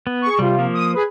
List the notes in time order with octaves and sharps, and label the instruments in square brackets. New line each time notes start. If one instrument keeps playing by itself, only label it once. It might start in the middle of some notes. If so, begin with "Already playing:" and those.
[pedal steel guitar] B3
[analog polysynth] G#4 C#6
[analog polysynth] C3 F4 [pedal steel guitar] G3
[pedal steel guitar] F3 A#3
[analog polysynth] D#6
G#4 B4